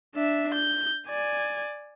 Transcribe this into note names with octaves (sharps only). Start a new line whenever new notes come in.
D4 E5
G6
D5 G#5